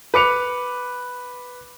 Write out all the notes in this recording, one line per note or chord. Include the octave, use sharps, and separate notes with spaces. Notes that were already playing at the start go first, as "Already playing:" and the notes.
B4 D6 C#7 F7